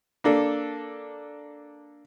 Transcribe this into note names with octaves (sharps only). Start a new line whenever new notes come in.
A#3 D4 A4